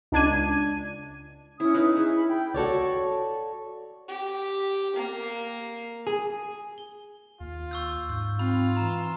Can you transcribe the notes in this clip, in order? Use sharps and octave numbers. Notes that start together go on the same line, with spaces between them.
C#2 D4 G#6 D#7
C#4 E4 D#6
D#4 E4 B4
E4 G#4
B5
G5
F#4 A4 C#5 D5
G4
A#3
G#4
G7
D#2 F4
C#6 E6 G6
G#2 G6
C4 F4 B5
E3 A#5 E7